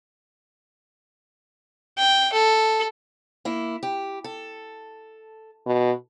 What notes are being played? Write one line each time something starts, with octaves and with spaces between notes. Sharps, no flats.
G5
A4
A#3 E4
G4
A4
B2